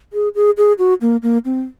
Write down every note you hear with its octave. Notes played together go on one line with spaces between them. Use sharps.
G#4
G#4
G#4
F#4
A#3
A#3
C4